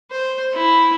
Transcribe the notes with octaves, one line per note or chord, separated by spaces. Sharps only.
C5
E4